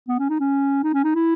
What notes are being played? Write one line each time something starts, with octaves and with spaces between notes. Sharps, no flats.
B3
C#4
D#4
C#4
D#4
C#4
D#4
E4